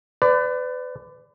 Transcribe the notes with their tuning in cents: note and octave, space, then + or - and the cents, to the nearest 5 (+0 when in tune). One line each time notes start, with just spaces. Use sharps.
B4 +35 D5 +0